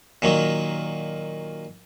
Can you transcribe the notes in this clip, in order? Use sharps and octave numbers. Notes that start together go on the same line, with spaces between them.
A#2 D#3 F#3